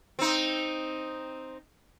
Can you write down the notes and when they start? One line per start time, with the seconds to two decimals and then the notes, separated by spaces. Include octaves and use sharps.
0.19 C4 D#4